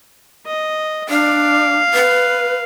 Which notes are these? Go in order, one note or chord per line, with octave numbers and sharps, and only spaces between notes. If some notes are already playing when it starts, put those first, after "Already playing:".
D#5
D4 F5
B4